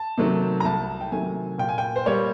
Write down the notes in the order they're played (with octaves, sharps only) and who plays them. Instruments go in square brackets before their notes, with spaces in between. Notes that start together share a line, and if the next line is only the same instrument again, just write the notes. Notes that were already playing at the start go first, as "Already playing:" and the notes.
Already playing: [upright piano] A5
C3 D#3 F#3 A3
A#5
C2 A5
G5
C3 D#3 F#3 A3 G#5
A#2 G5
G#5
G5
C5
G3 A#3 C#5